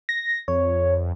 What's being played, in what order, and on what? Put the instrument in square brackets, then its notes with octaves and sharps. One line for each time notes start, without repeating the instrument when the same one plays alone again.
[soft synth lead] A#6
[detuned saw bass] F2 [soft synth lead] C#5